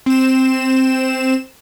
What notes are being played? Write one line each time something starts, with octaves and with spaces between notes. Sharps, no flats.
C4 E7